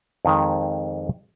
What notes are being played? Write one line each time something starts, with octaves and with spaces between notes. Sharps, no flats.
F2 D#3 G#3